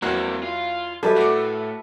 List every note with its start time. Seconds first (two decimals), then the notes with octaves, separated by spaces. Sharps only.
0.02 E2 F#3 A#3 C4 F#5
0.43 F4
1.03 F#3 G3 A4 B4 E5
1.16 A2 F#4 D5